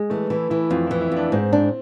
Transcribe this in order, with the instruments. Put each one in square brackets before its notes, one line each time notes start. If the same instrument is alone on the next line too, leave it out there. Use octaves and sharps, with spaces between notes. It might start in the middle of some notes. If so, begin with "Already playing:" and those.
Already playing: [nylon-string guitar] G#3
[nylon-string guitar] E3 [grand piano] A3
[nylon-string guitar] E3 [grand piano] E4
[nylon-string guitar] E3 [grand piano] E4
[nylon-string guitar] F2 [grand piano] F4
[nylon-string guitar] E3 [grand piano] E4
[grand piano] E4
[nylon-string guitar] F2 [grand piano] D4
[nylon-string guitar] G#2 [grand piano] C4
[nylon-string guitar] D4